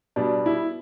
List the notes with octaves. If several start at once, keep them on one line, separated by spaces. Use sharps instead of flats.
B2 G3 D4
E4